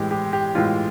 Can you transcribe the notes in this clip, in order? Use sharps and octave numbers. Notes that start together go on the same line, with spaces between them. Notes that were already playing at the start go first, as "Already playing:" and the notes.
Already playing: A2 E3 G#3 G4
G4
G4
A2 E3 G#3 F4